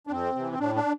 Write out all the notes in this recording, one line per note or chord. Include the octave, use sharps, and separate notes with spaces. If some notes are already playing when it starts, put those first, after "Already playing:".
D4
F2 C4
C3 E3
C4
A2 D4
D4